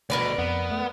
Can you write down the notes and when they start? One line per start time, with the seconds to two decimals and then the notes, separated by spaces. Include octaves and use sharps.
0.10 D2 B2 A#4 B4 D5
0.38 F2 B3
0.71 A3